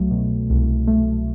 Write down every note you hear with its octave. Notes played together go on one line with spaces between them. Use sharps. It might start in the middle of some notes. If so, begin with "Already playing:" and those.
Already playing: C2 F#3 A3
B2
C2
A3